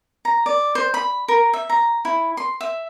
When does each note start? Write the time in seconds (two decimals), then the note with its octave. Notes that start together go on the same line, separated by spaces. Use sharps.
0.25 A#5
0.46 D5
0.75 C5
0.94 B5
1.28 A#4
1.53 E5
1.70 A#5
2.05 E4
2.37 C6
2.61 E5